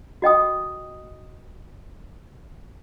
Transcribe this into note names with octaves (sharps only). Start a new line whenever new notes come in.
F#4 D#5 G5 D#6